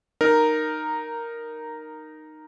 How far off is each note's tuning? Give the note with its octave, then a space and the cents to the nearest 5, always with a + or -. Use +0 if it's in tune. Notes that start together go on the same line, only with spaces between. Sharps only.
D#4 -10 A#4 +0